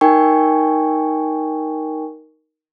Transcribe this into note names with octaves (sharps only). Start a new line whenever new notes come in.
D#4 A#4 G5 G#5 C#6